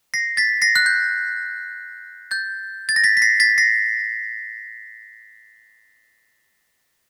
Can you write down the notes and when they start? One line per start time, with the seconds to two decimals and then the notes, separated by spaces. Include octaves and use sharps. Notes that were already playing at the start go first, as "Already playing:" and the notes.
0.14 A#6 C7
0.37 A6 B6
0.62 A#6 C7
0.76 F#6
0.86 G6
2.31 G6 A6
2.89 A6
2.96 A#6
3.04 A6 B6
3.17 B6
3.22 A#6 C7
3.40 A6 B6
3.58 A#6 C7